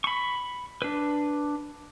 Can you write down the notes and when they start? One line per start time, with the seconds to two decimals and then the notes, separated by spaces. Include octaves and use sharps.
0.04 B5 C#6
0.82 D4 B4